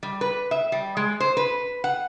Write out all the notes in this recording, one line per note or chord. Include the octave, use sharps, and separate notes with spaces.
G3
B4
E5
G3
G#3
C5
B4
F#5